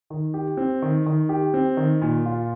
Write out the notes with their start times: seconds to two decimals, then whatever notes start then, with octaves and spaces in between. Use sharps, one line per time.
0.10 D#3
0.34 G4
0.57 C4
0.82 D#3
1.06 D#3
1.29 G4
1.54 C4
1.77 D#3
2.02 A#2
2.26 F4